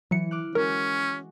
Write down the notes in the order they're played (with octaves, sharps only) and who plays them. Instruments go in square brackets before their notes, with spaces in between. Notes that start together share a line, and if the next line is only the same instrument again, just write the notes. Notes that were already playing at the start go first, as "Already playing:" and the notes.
[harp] E3 [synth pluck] F#3 C#7
[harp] D6 F6 F#6
[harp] G#3 F#4 [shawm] C#4 [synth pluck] A#4